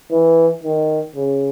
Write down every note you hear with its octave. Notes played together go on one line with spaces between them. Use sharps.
E3
D#3
C#3